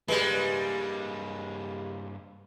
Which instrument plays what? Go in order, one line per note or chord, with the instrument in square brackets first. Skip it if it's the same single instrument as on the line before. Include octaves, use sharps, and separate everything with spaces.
[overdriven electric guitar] G2 A#3 [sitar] G3 G#3 [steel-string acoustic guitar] B4